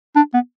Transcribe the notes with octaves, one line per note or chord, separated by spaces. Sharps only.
D4
B3